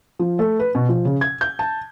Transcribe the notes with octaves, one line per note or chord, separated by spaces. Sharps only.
F3
A3
B4
B2
F3
C#3
G#6
G6
A5